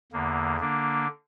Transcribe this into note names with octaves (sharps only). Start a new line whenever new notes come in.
E2 D3 A#3
D3 A#3 D4